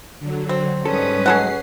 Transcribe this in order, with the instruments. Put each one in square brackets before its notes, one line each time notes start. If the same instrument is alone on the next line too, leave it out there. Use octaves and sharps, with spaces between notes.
[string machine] D3 F#3
[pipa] C4
[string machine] G#2 G3 D#6 [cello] C#4 B4 [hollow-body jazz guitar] A4
[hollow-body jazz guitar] G#2 F#3 G#3 [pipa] G#4 A4 F#5 [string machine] C7